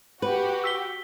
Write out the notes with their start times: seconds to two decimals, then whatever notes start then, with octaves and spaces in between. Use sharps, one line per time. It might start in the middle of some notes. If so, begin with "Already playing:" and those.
0.22 F#4 G4 B4
0.64 E6 B6 G7